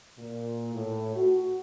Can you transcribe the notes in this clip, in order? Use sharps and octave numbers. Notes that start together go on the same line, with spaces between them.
A#2
A2
F#4